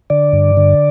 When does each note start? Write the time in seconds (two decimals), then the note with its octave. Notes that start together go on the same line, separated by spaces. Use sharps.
0.10 D3 D5
0.33 G2
0.57 D3